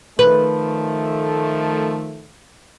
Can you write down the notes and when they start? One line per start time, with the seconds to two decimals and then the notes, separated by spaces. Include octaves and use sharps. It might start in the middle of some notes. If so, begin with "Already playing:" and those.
0.19 D#3 F3 A3 B4